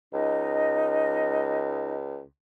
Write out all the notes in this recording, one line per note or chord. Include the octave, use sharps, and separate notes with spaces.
C#2 D#4 D#5